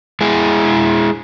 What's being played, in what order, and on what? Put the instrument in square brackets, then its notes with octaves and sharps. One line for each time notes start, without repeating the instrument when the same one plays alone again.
[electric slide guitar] G#3 E4 G#4